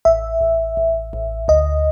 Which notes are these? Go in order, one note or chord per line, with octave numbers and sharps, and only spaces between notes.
A1 E5
A1
A1
A1
D2 D#5